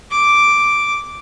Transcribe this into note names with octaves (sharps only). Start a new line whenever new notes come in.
D6